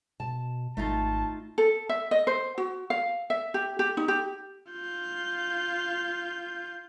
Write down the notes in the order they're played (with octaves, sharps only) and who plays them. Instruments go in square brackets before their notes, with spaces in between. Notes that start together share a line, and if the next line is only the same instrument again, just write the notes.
[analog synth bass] B2 [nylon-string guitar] A5
[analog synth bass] G#1 [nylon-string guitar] A3 D#4 F4 [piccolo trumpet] A5
[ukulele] A4
E5
D#5
C5
F#4
F5
E5
G4
G4
D#4
G4
[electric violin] F4 G6